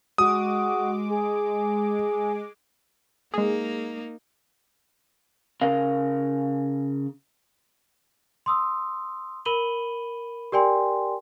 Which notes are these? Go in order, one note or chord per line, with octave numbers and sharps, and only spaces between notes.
G#3 F#4 D6 D#6
G#4
G#3 A#3 D#4 G#4
C#3 A#4 F5
C6 D#6 E6
A#4 B5 D#7 F#7 G7
G4 A#4 D5 G5 G#5 C6